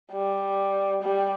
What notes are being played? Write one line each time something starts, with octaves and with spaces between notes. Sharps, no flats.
G3
G3